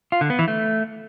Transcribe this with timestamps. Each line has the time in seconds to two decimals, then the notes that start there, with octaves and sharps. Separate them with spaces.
0.12 F4
0.21 D3
0.30 B3
0.39 E3
0.48 A3